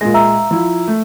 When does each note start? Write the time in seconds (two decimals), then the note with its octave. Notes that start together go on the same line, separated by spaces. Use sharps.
0.01 A#2 G#3 A#6
0.14 E5 A#5 E6
0.51 F3 E4
0.87 A3